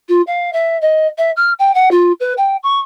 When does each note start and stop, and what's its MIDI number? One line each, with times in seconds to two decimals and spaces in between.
0.08 0.21 65
0.27 0.52 77
0.52 0.77 76
0.81 1.07 75
1.18 1.30 76
1.36 1.51 89
1.59 1.73 79
1.74 1.89 78
1.91 2.12 65
2.20 2.33 71
2.37 2.56 79
2.63 2.80 85